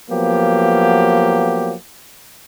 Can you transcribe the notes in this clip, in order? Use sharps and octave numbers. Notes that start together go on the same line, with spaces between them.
F3 F#3 A#3 B3 G4